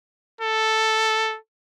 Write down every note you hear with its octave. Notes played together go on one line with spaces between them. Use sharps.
A4